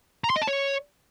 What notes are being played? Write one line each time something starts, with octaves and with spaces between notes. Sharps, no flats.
A#5
C6
D#5
A5
C#5